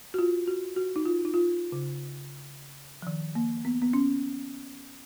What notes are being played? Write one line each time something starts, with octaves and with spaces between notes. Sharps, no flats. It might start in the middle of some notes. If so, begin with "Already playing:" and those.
F#4
F4
F#4
F#4
D#4
F4
D#4
F4
C#3
F3
D#3
A#3
B3
B3
C#4